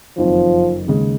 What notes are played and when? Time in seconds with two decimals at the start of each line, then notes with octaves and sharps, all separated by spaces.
0.17 F#1 F2 D#3 F3
0.87 D#2 C#3 G#3